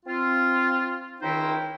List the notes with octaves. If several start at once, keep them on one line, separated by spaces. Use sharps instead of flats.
C4 F4
C#2 D#3 D#4 E4 C5 G5